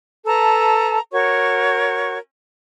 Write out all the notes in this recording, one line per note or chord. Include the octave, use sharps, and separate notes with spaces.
A4 B4 A5 A#5
F#4 A#4 C#5 C#6